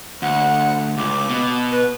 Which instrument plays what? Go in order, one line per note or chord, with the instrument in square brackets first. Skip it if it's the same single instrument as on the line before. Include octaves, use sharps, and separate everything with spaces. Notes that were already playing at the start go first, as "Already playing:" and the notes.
[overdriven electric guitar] D2 [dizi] F#5
[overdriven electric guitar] C#2 [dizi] D6
[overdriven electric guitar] B2
[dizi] B4